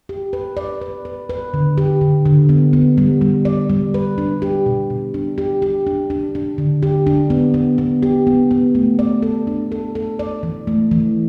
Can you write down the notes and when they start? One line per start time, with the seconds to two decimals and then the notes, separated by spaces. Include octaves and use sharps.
0.09 G4
0.33 B4
0.57 D5
0.81 B4
1.05 B4
1.30 B4
1.54 D3
1.78 G4
2.01 D3
2.26 D3
2.49 B3
2.73 B3
2.98 G3
3.21 G3
3.45 D5
3.70 G3
3.94 B4
4.18 D4
4.42 G4
4.66 B2
4.90 B2
5.14 D4
5.38 G4
5.62 G4
5.87 D4
6.10 D4
6.35 D4
6.58 D3
6.83 G4
7.07 D4
7.30 B3
7.54 B3
7.78 B3
8.03 G4
8.27 B3
8.51 B3
8.75 A3
8.99 D5
9.22 A4
9.47 D4
9.72 A4
9.95 A4
10.19 D5
10.43 E3
10.67 A3
10.91 E3